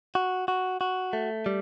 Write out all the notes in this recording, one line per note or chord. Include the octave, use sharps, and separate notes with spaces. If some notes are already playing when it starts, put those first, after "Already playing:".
F#4
F#4
F#4
A3
G3